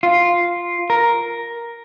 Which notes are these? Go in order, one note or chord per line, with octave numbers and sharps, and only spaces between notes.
F4
A#4